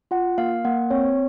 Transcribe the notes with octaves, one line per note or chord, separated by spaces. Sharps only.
F4 F#5
A#3 F5
A#3 F#5
C4 C#5